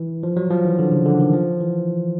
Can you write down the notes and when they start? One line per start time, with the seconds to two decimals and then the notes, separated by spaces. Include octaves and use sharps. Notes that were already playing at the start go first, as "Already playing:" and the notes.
Already playing: E3
0.23 F3
0.37 F#3
0.51 F3
0.65 E3
0.79 D3
0.91 C#3
1.05 D3
1.20 D#3
1.33 F3
1.60 E3